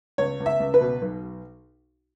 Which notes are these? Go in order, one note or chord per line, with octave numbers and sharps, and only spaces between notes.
C#2 C#5
C#2
E5
C#2
B4
B2
B1